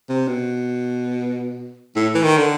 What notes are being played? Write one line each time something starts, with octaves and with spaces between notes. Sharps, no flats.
C3
B2
A2
E3
D#3
D3